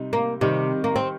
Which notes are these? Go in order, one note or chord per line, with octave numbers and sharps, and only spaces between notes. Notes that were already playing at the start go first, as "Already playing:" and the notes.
Already playing: C3 G3 D#4
A#3
C3 D#3 G3 D#4
A#3
C4